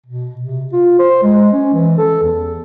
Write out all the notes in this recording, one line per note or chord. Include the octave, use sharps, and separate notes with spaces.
B2
C3
F4
C5
G#3
C#4
E3
A4
E2